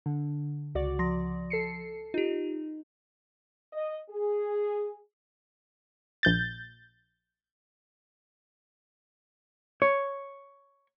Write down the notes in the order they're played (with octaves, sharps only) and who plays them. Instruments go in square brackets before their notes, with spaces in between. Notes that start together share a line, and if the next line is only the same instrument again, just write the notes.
[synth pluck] D3
C#2 F#4 D5
[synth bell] F3 C6 A#6
[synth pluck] A4 C7 C#7
[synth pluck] D#4 [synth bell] F4 G4
[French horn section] D#5
G#4
[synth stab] A#1 G6 A6
[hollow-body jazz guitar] C#5